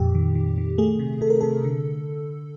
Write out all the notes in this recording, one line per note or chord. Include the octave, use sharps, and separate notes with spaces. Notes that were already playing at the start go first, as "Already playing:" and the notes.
Already playing: F2 A#2 G4
D#3
D#3
D#3
A3 G#4
C3
C3 A4
A#4
C3 A4
D3